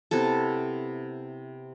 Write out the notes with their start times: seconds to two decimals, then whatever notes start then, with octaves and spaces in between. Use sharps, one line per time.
0.11 C3 B3 E4 A4